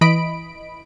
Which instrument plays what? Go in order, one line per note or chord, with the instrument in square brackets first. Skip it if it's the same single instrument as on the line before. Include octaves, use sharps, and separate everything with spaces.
[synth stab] E3 D#5 B5 D7